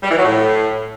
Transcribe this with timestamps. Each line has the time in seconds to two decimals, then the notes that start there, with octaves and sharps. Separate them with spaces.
0.04 G3
0.11 E3
0.18 F#3
0.25 A2